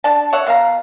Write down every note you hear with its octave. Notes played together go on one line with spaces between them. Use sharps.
D4 A5
C#5 E5 F#5
B2 F5 A#5